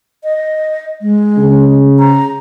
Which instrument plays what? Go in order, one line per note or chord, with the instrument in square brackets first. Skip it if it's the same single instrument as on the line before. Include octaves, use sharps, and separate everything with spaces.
[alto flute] D#5
G#3
[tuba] C#3
[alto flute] A#5